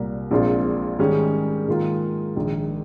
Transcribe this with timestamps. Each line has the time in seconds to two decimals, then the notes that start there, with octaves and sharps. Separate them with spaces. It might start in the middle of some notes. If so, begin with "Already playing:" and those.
Already playing: C2 A#2 G3 A#3
0.31 A#1 A#2 G#3 C4 F4
0.99 G#2 D#3 G3 C#4 G#4
1.67 G#2 D#3 A#3 F4 G#4
2.36 A#1 G#2 D#3